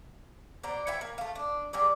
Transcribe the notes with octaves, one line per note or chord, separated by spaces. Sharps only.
B2 C5 D5 A#5
E4 C#5 E5 G5
A#3
A3 F5
D4
F#3 G3 G#4 D5